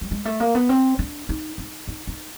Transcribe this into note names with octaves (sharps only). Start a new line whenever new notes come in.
G3
G#3
A3
A#3
B3
C4
D4
D#4
D#4
D#4
D#4